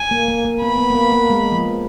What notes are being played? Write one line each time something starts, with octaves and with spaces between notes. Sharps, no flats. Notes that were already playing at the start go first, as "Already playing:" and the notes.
Already playing: G#5
A#3
A#3
A#3
B3 B5
B3
A#3
B3
A#3
G#3
F3